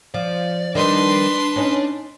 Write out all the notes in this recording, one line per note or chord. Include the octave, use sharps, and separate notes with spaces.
F3 D5
D#3 G3 D4 D#4 B4 C6
C#4 D#4